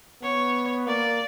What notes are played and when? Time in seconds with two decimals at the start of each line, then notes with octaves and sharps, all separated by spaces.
0.23 B3 C#5
0.87 A#3 D5